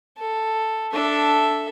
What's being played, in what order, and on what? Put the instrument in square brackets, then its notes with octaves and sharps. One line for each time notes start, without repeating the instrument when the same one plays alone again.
[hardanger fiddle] A4
[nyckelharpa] D4 [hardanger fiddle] A4 E5